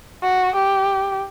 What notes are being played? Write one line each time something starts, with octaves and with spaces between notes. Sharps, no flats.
F#4
G4